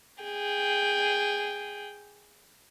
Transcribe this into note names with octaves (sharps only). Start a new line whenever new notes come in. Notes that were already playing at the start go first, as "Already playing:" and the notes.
G#4 G5